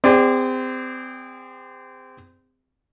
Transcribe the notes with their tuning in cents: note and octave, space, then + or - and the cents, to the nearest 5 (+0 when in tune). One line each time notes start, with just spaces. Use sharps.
C4 -25 G#4 -45 D5 +0